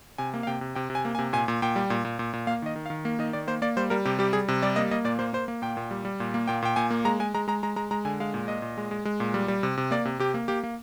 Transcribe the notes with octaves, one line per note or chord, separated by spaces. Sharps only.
C3 G#5
A#3
F5
C3 G5
C3
C3 G5
C3
G#5
A#3
G#5
C3
A#2 G#5
A#2
A#2 G5
G3
A#2
A#2
A#2
A#2
A#3 F5
D#3 D#5
D#3
F5
D#3
A#3
D#3 D#5
D#3 D5
A#3 C5
A#3 D5
G3 C5
G3 A#4
C3 G4
G3 G4
G3 G#4
C3
G3 D5
A#3 D#5
A#3 D#5
A#2 D5
A#3 C5
A#3 C5
A#3
A#2 G5
A#2
G3
G3
A#2
A#3
A#2 G5
A#2 G5
A#2 G#5
A#3
G#3 A#5
G#3 G#5
G#3 A#5
G#3 A#5
G#3 A#5
G#3 A#5
G#3 A#5
D3 G#5
G#3 F5
A#2
A#2 D#5
A#2
G#3
G#3
G#3
A#2
G3
G3
C3
C3
A#3 D5
C3
C3 G4
A#3
A#3 G4
A#3